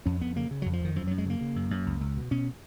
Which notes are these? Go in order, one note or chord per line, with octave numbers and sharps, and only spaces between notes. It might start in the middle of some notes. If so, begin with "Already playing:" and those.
F2 C#4
F2 B3
C#3 A#3
C#3
F2 F#3
F3
F2 D#3
F#2 F3
F#3
F#2
G#3
C#3 A#3
C#3
F#2
F#2
C#2
C#2
B2
B2 C#4